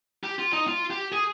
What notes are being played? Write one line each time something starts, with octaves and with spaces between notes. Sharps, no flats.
G4
F4
D#4
F4
G4
G#4